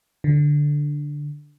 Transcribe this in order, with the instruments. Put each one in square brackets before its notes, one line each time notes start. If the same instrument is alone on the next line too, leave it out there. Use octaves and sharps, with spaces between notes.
[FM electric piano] D3